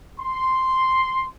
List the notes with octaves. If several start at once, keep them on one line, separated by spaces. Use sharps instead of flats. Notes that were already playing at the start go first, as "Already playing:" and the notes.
C6